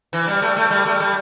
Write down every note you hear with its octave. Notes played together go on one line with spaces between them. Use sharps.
E3
G3
A3
A3
G3
A3
G3